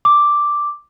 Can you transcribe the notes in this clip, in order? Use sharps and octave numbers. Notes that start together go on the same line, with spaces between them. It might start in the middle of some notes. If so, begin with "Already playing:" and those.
D6